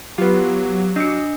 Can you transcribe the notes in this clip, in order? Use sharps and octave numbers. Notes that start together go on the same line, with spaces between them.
F#3 B3 F4 G4
D4 D#5 D6 D#6 C#7